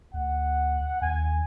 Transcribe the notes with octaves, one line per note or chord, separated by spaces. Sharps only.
D2 F#5
D#2 G#5